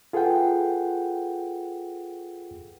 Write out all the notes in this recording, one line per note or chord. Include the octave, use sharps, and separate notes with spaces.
F4 G#4 A4 B4 F#5 G5